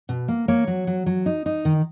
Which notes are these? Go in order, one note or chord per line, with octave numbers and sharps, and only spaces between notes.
B2
A#3
A#3 C#5
F#3
F#3
F#3
D#4
D#4
D#3